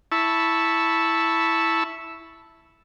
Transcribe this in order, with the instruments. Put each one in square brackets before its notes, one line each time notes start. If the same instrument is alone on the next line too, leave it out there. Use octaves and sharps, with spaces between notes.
[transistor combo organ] E4 A5 B5 C#6 E6